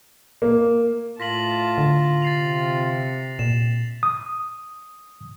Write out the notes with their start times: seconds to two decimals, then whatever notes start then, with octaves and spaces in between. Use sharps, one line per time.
0.42 A#3
1.20 A2 F4 A5 A#6 B6 F#7
1.78 D3
2.22 C3 A6 C7 F7
3.39 A#2 E7
4.03 D#6